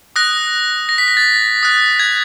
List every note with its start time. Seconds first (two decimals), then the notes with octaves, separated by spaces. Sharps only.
0.16 D#6 F#6 A#6
0.89 A#6
0.98 B6
1.08 A#6
1.17 A6
1.63 D#6 F#6
1.99 G#6